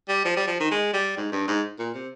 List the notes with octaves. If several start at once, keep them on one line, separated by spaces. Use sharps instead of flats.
G3
F3
G3
F3
D#3
G#3
G3
G#2
G2
G#2
A#2
C3